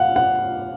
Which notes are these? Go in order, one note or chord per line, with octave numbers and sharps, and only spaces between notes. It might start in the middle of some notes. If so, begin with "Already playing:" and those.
Already playing: F5 F#5
F#5